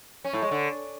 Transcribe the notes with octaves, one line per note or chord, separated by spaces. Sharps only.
C#4
A2
G#3
D3